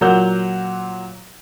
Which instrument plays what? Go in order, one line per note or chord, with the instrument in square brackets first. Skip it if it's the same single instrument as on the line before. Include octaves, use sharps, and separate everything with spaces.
[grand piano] A#2 F#3 A#4 F#5 E6 G6